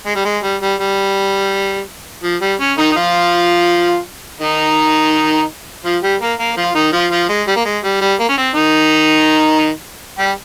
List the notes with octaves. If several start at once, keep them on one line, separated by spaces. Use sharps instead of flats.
G#3
G3
G#3
G3
G3
G3
F3
G3
C#4
D#3 D#4
D#4
F3 F4
D#3 D#4
F3 F4
G3 G4
A#3 A#4
A#3 A#4
F3 F4
D#3 D#4
F3 F4
F3 F4
G#3
G3
A#3
G#3
G3
G3
A#3
C#4
C4
D#3 D#4
G3 G4